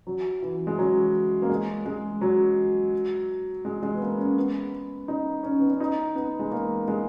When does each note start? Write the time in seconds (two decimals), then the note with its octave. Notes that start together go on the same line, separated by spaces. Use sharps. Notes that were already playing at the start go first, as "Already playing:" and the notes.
0.07 F#3
0.42 E3
0.67 G#3
0.78 F#3
1.42 A#3
1.49 G#3
1.86 G#3
2.21 F#3
3.65 G#3
3.83 G#3
3.95 B3
4.01 A#3
4.18 C#4
4.36 B3
5.08 D#4
5.43 C#4
5.59 B3
5.69 C#4
5.80 D#4
6.15 B3
6.39 G#3
6.51 A#3
6.88 G#3